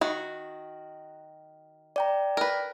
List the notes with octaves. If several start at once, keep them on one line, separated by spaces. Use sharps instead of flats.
D#3 F#4
D5 G5 A#5
A#4 B4